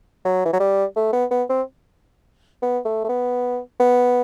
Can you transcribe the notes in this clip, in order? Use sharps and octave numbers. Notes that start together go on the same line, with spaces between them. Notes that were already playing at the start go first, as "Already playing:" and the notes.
F#3
E3
F#3
G3
A3
B3
B3
C4
B3
A3
A3
B3
B3